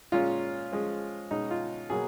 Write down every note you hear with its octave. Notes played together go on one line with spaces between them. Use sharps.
A#2 G#3 C#4 F4
F3 G#3 C#4
B2 G#3 C#4 D#4
F4
B2 F#3 A#3 G#4